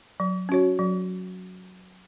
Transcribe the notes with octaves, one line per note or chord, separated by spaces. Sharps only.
F#3
C#4 F#4 C#5
F#3